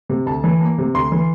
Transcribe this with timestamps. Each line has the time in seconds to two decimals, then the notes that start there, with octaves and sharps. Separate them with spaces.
0.09 C3
0.26 D2 A5
0.44 E3
0.61 A#3
0.78 C3
0.94 D2 C6
1.12 E3